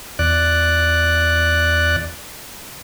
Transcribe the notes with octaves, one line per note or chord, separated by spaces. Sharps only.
E2 D5 F#6